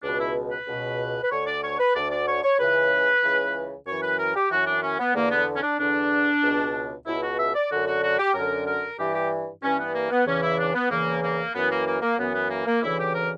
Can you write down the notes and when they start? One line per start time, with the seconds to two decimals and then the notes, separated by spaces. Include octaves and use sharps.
0.03 C#2 B2 D4
0.19 E4
0.51 B4
0.67 C#2 B2
1.23 B4
1.31 D2 D3 C#5
1.46 D5
1.63 C#5
1.79 B4
1.95 D2 D3 D5
2.10 D5
2.27 C#5
2.43 C#5
2.59 C#2 C#3 E3 B4
3.22 C#2 C#3 E3
3.86 F#2 E3 C#5
4.02 B4
4.19 A#4
4.35 G4
4.50 F#2 E3 F#4
4.66 D4
4.82 C#4
4.99 B3
5.15 E2 D3 A#3
5.30 B3
5.55 C#4
5.62 D4
5.79 E2 D3 D4
6.43 C#2 B2
7.06 C#2 B2 E4
7.22 F#4
7.38 E5
7.55 D5
7.71 F#2 D3 F#4
7.86 F#4
8.03 F#4
8.18 G4
8.34 F#2 D3 A#4
8.66 A#4
8.98 G2 E3 G4
9.15 G4
9.63 G2 E3 C#4
9.79 B3
9.94 A#3
10.10 B3
10.26 E2 C#3 E3 C#4
10.43 E4
10.59 D4
10.74 B3
10.90 E2 C#3 E3 A#3
11.23 A#3
11.54 F#2 E3 B3
11.70 A#3
11.87 A#3
12.02 A#3
12.18 F#2 E3 B3
12.34 B3
12.50 A#3
12.66 A#3
12.82 D2 C#3 E3 E4
12.98 G4
13.14 A#4